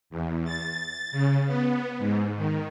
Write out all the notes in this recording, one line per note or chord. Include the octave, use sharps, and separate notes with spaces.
E2
A6
C#3
B3
G#2
D#3